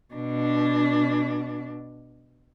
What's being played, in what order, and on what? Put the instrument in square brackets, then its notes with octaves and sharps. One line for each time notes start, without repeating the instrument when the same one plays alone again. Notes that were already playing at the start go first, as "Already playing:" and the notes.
[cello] B2 D4